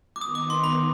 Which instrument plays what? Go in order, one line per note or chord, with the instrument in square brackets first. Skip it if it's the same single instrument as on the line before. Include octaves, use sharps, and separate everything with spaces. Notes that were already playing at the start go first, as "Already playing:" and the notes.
[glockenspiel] D6
[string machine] D#3 B3 D#4 [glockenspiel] D#6
[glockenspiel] D6
C6
B5